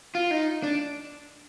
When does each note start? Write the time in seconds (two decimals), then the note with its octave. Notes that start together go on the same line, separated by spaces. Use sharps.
0.15 F4
0.31 D#4
0.63 D4